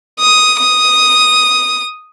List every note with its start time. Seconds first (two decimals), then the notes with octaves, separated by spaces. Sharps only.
0.20 D#6
0.61 D#6